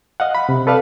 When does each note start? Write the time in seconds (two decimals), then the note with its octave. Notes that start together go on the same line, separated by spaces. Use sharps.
0.20 D#5 F5 F#5
0.35 B5
0.49 C3
0.67 A4 B4 D5 F5 A5